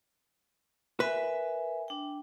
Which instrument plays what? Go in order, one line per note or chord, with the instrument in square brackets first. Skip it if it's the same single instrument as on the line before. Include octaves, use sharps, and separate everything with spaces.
[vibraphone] A#4 E5 G#5 [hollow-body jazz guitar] B4
[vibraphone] D4 G5